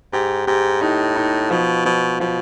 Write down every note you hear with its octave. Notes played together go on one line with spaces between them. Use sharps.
G#2 G4
G#2 G4
A2 D#4
D#4
B2 F3
B2 F3
B2 F3